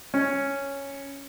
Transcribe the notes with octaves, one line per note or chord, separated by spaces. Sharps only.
C#4